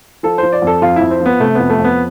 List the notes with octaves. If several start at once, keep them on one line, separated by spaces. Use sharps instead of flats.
F3 A4
F3 C5
D5
F2 A4
F2 F4
E4
F2
C4
F3 B3
C3 A3
F2 B3
A3
F2
B3